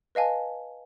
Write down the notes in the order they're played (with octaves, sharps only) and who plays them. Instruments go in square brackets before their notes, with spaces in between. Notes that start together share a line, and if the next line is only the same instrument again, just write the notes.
[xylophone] B4 D#5 F5 G#5 A5